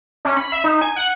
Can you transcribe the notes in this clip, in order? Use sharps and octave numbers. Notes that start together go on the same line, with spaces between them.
C#4
B5
E5
D#4
G#5
F#5